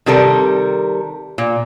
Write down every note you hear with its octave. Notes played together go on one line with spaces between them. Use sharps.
C3 D#3 G3 A4 A#4
A#2